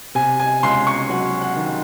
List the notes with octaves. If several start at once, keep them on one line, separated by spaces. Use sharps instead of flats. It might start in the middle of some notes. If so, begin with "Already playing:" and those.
C3 G#5
G#5
C#2 C6
C#6
F#3 F#5
F#5
D#3